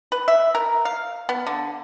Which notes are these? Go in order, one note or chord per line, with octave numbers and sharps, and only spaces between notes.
B4
E5
A#4
F5
B3
D3